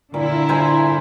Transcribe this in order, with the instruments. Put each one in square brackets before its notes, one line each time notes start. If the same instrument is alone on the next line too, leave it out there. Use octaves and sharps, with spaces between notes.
[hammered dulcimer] A#2 [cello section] D3 E4 F4
[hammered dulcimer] C5 G#5 A#5